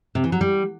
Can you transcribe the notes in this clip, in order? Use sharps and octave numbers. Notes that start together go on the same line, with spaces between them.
C3
E3
F#3
G3